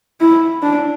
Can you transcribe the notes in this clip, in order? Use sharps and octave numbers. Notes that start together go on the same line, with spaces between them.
E4
D4